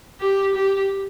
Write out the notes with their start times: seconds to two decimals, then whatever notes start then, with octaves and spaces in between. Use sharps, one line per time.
0.20 G4
0.55 G4